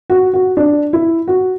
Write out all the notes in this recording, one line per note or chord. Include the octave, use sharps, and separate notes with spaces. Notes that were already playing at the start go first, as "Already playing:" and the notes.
F#4
F#4
D4
E4
F#4